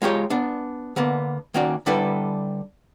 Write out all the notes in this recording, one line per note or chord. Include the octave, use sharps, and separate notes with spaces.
G#3 F4 G4 C#5 G5
B3 D4
D3 A#3 B3
D#3 A#3 C#4 F#4 D5
D3 G3 D4 E4 A4 B4